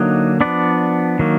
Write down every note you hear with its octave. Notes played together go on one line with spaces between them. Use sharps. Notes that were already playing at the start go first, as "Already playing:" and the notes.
Already playing: D3 F#3 A#3 D#4 D#5
F3 B3 D4 D5
D#3 F#3 A#3